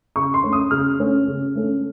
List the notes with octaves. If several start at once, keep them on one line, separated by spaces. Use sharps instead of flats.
C#3 C#6
C6
A3 C#4
D#6
C#3 F6
A3 C#4
C#3
A3 C#4